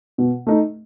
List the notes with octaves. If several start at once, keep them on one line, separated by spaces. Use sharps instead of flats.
B2
A3 D#4